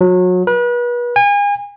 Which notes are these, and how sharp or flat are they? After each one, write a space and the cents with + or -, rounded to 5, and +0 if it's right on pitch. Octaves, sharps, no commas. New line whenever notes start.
F#3 -30
B4 -35
G#5 -35